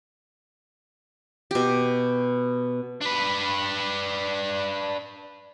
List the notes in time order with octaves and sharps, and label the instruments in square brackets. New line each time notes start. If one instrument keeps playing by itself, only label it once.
[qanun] B2 G4
[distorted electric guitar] D4 B4